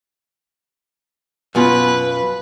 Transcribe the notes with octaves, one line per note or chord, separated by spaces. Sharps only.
F#2 B2 F4 B4